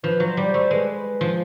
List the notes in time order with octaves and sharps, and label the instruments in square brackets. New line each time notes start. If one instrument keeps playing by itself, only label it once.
[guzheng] F3 [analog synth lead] B4
[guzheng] F#3
[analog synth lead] C5
[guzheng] G3
[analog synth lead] C5
[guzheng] A3
[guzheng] G#3 [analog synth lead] B4
[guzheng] F3